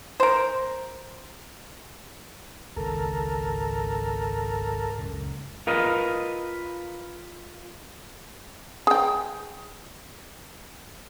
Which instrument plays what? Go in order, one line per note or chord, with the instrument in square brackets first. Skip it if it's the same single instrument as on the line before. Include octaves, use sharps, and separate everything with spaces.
[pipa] A#4 C5
[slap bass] G#1 C#2 G#2 [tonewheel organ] A4 A#4
[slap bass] C#2 F#2 A#2
[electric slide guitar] F4 A#4 B4 D#5
[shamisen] G#4 G5